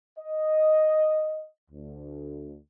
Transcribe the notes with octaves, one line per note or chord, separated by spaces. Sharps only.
D#5
D2